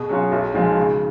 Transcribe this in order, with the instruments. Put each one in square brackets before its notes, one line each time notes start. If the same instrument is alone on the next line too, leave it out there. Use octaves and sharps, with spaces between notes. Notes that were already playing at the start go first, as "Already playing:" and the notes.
Already playing: [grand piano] B2 [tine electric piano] G#4
[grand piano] F#3 C#4 F4
[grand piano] B1 [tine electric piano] F#4
[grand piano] A#2 F3 G#3 [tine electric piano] D#4
[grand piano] C#3